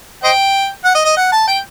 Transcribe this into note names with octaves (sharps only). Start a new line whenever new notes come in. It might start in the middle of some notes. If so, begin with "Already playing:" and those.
C5 D#5 G5
F#5
D#5
D#5
F#5
A5
G5